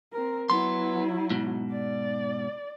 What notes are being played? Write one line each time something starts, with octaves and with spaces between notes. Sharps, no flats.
C4 A#4
F#3 B3 E4 C6
G#2 B2
D5